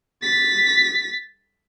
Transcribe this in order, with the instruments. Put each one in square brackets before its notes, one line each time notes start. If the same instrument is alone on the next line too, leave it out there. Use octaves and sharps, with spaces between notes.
[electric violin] A6 B6